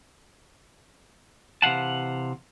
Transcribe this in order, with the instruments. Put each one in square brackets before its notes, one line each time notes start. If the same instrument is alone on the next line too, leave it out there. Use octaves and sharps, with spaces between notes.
[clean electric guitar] C3 E3 F5 F#5 A5